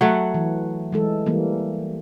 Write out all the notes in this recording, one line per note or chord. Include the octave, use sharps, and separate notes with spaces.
F#3 A3 F#5
E3
E3 G#3 A4
E3 G3 A#3